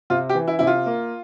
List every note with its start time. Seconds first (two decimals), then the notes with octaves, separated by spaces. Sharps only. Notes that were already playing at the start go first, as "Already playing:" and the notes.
0.10 C3 F4
0.29 G4
0.35 E3
0.47 E4
0.59 C3 E4
0.67 F4
0.86 A#3